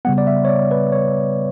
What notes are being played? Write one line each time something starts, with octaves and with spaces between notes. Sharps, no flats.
C#3 G3 B3 F#5
D5
E5
C#5
D5
B4
C#5